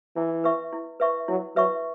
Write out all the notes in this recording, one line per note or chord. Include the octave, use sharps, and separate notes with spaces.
E3 E4
B4 E5 C#6
E4
B4 E5 C#6
F#3 E4
F#3 B4 E5 C#6